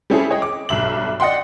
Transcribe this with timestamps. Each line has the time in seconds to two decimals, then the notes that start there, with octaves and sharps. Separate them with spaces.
0.10 G3 C4 C#4 E4 G#4 A4
0.30 G#4 C#5 D#5 G5
0.42 D6
0.69 B1 G2 E5 F#7
1.20 D5 D#5 F#5 G5 C6